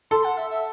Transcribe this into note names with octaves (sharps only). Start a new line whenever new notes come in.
A4 C6
F#5
E5
E5